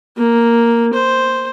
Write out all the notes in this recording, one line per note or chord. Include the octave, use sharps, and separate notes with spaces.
A#3
C5